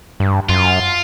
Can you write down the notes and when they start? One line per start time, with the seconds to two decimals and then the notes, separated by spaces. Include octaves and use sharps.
0.20 G2
0.49 F#2 F4